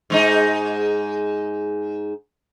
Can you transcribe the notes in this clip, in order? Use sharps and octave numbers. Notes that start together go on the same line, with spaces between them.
G#2 G#3 D#4